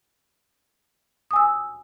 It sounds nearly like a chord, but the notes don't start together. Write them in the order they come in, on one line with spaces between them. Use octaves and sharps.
D#6 G#5 E6